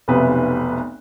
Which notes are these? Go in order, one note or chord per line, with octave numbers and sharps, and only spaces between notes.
F1 B1 C3 B3 B4 E5